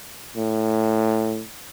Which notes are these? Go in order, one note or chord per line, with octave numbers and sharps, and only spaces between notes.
A2